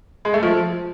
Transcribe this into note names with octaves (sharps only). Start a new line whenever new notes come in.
G#3
A3
F3